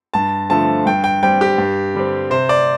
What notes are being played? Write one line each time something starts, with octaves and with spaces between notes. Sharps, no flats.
G2 A5
D3 F3 A3 C4 A5
G2 G5
G5
G3 C4 G5
G4
G2
D3 G3 C4
C3 C5
D5